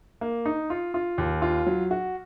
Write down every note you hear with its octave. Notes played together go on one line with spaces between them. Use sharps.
A#3
D#4
F4
F4
D#2
F4
F#3
F#4